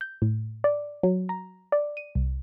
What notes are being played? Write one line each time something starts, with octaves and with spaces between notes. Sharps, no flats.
G6
A2
D5
F#3
A#5
D5
D#7
C2